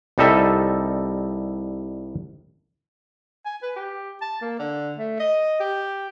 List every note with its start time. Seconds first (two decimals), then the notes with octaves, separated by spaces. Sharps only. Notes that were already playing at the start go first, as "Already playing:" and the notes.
0.18 C2 G3 D#4 A4 E5
3.46 G#5
3.63 B4
3.76 G4
4.21 A5
4.42 A#3
4.59 D3
4.98 A3
5.20 D#5
5.60 G4